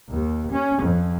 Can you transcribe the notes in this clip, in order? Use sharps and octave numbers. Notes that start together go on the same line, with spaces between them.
D#2
C#4
F2